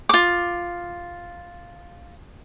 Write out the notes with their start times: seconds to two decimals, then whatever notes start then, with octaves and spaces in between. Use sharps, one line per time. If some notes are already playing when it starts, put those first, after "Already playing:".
0.09 F4 D6